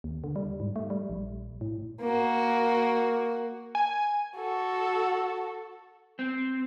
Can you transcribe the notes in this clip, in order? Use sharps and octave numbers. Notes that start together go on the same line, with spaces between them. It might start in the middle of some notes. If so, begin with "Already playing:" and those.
D#2
D3
G3
G#2
A3
G3
A#1
A2
A#3 F#4
G#5
F#4 A4
C4